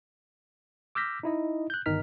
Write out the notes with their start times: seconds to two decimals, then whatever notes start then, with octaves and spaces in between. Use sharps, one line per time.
0.95 D6 E6 F6 G6 A#6 B6
1.23 D#4 E4 D#5
1.70 F#6 G6
1.86 G1 D#3 D#4 F6 B6